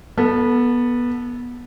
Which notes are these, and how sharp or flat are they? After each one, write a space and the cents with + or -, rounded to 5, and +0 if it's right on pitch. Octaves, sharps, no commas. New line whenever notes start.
B3 -20 A4 +0